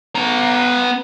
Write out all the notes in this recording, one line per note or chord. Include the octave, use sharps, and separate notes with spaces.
B3 A#5